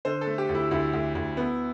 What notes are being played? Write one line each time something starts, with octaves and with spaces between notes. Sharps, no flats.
D3 C5
A4
A3
G4
D2
E4
D2 E4
D2
D2
B3